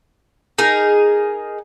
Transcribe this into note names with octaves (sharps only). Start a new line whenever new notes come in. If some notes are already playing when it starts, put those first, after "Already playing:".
D#4 G#4 A#4